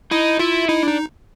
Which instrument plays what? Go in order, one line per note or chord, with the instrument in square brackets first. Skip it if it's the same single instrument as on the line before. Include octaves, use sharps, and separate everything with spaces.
[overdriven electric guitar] D#4 [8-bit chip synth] E4
[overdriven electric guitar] E4 [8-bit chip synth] F4
[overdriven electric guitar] D#4 [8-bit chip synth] E4
[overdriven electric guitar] D4
[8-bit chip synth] D#4